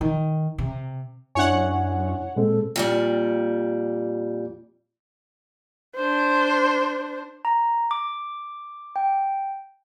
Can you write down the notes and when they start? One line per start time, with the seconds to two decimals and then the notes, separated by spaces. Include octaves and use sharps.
0.01 D#3
0.58 C3
1.35 F#2 D4 E4 C#5 F#5 G#5
2.36 A#2 G#3 C4 A4
2.76 F2 A#2 G3
5.96 D4 C5
7.45 A#5
7.91 D6
8.96 G5